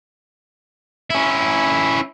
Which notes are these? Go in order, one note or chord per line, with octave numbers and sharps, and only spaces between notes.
C#4 E4